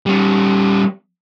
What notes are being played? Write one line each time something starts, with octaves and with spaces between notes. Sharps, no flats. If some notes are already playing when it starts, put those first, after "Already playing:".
G3 C#4